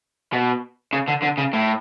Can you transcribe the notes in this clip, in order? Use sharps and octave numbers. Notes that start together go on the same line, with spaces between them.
B2
C#3
D3
D3
C#3
A2